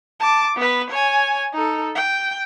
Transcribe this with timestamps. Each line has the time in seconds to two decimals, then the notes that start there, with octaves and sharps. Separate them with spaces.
0.20 A5 D6
0.57 B3 B4
0.90 C#5 G#5
1.53 D#4 A4
1.95 G5